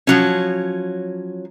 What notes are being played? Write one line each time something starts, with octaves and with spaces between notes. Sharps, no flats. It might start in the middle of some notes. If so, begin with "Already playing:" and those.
F3 F#3 C#4